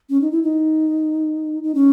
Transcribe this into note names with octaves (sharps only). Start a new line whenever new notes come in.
C#4
D#4
E4
D#4
D#4
C#4